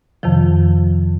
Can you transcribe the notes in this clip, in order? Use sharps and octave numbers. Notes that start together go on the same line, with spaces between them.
F2 C3 D#3 F3